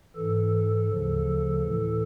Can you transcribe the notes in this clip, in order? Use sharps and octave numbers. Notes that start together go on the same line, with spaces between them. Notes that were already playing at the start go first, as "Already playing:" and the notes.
G#2 E3 A4
D2 C#3 F3
A2 E3